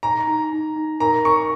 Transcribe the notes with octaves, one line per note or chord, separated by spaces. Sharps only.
D#4 A#5
D#4
D#4
D#4
A#4 A#5
A#4 C#6